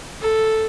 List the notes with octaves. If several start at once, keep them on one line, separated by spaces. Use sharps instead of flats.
A4